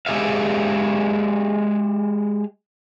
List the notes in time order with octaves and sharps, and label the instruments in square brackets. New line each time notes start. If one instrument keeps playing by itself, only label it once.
[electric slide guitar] G#3 G4 G#4 E5 F5